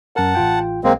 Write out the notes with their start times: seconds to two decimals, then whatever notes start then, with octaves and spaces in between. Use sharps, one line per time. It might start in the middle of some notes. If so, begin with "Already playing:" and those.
0.16 F#2 A#4 F#5 A5
0.35 A1 F4 G5
0.84 B1 G#3 A#3 C4